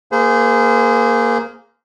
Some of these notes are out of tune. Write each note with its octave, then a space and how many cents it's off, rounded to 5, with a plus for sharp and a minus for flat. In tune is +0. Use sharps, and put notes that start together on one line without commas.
A#3 +0 G#4 +0 C5 -35